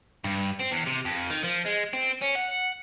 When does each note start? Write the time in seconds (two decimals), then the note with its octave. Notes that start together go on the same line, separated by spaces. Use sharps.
0.24 G2
0.59 C4
0.71 E2
0.86 C3
1.05 F2
1.31 D#3
1.44 F3
1.66 G#3
1.94 C4
2.22 C#4
2.36 F#5